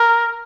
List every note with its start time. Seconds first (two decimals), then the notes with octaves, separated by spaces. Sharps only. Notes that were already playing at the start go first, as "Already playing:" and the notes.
Already playing: A#4